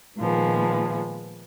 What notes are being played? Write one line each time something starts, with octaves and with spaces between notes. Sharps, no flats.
A#2 D#3 F3 G#3 B3